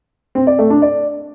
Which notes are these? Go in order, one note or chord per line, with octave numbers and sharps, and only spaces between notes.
C4
D5
A3
D4
D5